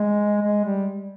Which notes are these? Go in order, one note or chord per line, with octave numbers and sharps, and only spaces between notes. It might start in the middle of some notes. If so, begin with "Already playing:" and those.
Already playing: G#3
G#3
G3